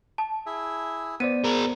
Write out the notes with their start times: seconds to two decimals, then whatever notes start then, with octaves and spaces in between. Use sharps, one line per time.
0.18 A5
0.46 E4 G#4 E5
1.20 B3 C5 D5 D#7
1.44 A#3 G#4 A#4